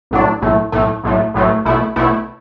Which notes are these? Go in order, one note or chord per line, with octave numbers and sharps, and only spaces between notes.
B1 A2 F#3 D4
B1 A2 A3
B1 A2 A3
B1 A2 F#3 A3
B1 A2 F#3 A3
B1 B2 A3 E4
B1 B2 A3 E4